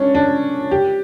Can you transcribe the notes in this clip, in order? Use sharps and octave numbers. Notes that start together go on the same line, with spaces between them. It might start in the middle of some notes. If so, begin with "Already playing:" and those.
Already playing: C#4 D4
D4
G4